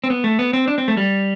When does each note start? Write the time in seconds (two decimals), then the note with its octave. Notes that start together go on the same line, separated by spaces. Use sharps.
0.04 C4
0.10 B3
0.24 A3
0.39 B3
0.53 C4
0.68 D4
0.78 C4
0.88 A3
0.97 G3